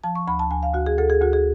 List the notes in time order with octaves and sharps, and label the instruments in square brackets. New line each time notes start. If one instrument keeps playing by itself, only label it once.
[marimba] F3 A5
C#6
D2 B5
A5
D2 G#5
F5
D2 F#4
G#4
D2 A4
G#4
D2 F#4
G#4